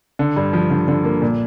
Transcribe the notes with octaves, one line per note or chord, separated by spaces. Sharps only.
D3
G2
F3
D3
D3
A#3
A#2